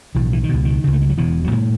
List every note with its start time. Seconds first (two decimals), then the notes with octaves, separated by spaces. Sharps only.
0.15 B1 A2 E3
0.33 E3
0.44 D#3
0.49 C#2 B2
0.65 D#3
0.84 C#2 C#3
0.93 A3
1.02 G#3
1.10 F#3
1.17 E1 E2 B2 E3
1.44 F#3
1.52 A2 G#3